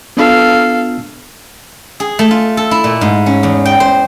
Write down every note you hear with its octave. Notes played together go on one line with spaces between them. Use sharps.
B3 D4 F4 A4 F5
G#4
A3
F4
A4
E4
A#2
G#2
C#4
E2
G5
C5